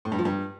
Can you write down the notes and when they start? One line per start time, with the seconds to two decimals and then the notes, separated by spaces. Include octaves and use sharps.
0.05 A2
0.12 G2
0.19 F3
0.25 G2